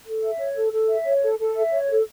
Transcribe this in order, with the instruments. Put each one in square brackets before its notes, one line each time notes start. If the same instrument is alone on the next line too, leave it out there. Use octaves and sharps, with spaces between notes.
[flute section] A4
E5
C#5
A4
A4
E5
C#5
A4
A4
E5
C#5
A4